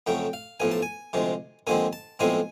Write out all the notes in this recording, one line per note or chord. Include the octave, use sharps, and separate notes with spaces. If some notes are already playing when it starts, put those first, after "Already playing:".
F2 C#3 F#3 A3 G5
F5
B1 A2 F3 G#5
A5
G#5
D2 C3 F3 G#3
D#2 D3 F3 G#3 C4 G#5
A5
B1 A2 F3 G#3 C4 G#5